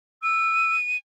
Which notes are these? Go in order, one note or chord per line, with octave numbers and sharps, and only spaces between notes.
E6 D#7